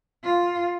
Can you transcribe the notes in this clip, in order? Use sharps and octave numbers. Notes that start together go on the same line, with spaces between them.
F4